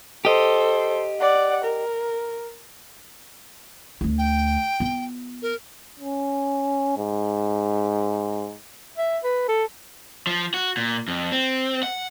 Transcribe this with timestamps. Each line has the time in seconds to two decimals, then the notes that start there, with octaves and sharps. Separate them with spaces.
0.25 G4 A4 C5 D#5
1.20 D5 F#5
1.64 A#4
4.01 D2 D3
4.18 G5
4.80 B3 F4
5.42 A#4
6.00 C#4
6.97 G#2
8.98 E5
9.24 B4
9.48 A4
10.27 F3
10.54 F#4
10.77 A#2
11.08 F2
11.32 C4
11.83 F#5